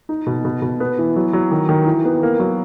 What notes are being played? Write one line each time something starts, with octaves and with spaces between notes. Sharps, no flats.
D#4
B2
B2
B2
B3
E3
F#3
F#3
D#3
D#3
E3
B3
A#3
F#3